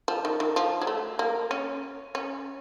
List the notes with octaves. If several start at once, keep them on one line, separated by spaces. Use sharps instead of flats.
F3
D#3
D#3
F3
F#3
A3
A#3
C#4
C#4